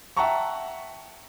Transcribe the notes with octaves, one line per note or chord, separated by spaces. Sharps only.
E5 F#5 G5 A5 A#5 C#6